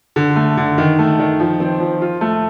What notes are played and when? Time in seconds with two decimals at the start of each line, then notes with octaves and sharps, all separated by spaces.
0.16 D3
0.36 A3
0.57 D3
0.78 D#3
0.99 A3
1.19 D#3
1.40 F3
1.60 C4
1.80 F3
2.02 F4
2.21 A3